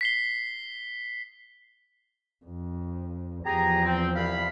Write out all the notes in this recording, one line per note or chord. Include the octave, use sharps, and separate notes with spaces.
B6 C7 G7
F2
E2 F3 G4 G#4 A#5
C4
C2 F5 B5